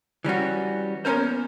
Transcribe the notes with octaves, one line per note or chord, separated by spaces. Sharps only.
E3 G3 C#4 F#4
A#3 B3 C#4 A#4 C5